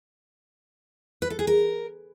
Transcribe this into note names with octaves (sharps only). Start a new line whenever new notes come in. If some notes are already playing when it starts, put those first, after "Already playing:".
B4
A4
G#4
A#4